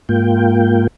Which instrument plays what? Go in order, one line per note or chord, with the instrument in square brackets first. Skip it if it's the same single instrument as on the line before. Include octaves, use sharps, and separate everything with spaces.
[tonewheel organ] G#2 A#3 F4 G5